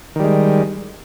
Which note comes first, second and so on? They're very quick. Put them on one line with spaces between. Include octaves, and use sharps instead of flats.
D#3 G3 G#3